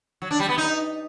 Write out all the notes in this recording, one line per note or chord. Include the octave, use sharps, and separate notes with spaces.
F#3
D4
G3
B3
D#4